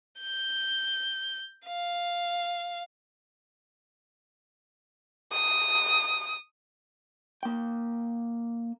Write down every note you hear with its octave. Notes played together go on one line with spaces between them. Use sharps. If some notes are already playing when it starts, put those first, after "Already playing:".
G6
F5
D#6
A#3 G5